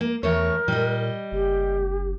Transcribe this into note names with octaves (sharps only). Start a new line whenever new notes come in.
A#3
E2 E3 A3 A#4 C#5
A#2 G3 D#5
F#1 G4